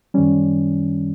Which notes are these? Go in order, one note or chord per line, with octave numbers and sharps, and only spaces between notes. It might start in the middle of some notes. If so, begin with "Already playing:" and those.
F#2 D#3 G3 C#4